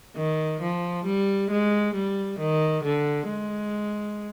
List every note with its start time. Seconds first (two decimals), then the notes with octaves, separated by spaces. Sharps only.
0.16 D#3
0.61 F3
1.05 G3
1.50 G#3
1.95 G3
2.39 D#3
2.84 D3
3.29 G#3